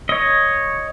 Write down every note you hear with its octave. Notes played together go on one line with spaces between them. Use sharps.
C#5 D#5